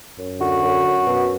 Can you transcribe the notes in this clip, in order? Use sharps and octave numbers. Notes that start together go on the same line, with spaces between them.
F#2
D3 F#4
F#2
F#2
B2